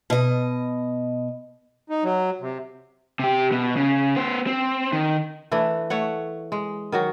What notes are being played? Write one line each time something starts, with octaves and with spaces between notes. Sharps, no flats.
B2 D#5
D#4
F#3
C3
C3 G4
B2
C#3
B3 C5
C4
D#3
E3 A3 D4
A3 C#5 F#5
G#3
D#3 F#3 F#4